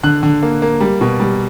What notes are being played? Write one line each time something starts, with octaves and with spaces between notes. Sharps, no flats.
D3 F#6
D3
A#3
A#3
G3
B2
G3